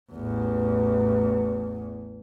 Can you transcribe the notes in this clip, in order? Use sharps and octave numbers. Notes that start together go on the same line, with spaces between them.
A1 E2